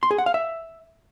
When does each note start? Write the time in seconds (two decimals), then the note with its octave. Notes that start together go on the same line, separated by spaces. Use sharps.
0.03 C6
0.11 G#4
0.18 F#5
0.26 F5
0.34 E5